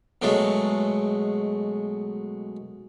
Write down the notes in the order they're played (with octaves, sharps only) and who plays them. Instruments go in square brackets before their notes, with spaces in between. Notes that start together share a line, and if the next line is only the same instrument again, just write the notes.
[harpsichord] B2 F#3 G#3 A3